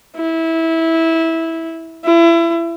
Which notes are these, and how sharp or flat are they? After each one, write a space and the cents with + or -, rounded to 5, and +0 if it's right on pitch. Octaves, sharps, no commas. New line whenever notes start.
E4 -15
E4 +30